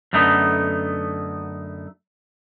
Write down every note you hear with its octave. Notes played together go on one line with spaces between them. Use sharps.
F#2 D3 A3 B3 D#4